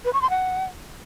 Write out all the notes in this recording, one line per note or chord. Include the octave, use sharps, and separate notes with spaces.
B4
C#6
C6
F#5